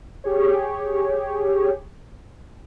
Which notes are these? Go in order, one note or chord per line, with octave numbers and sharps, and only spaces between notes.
G4 G#4 C#5